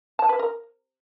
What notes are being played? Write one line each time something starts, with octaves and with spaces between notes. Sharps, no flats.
A5
B4
A#4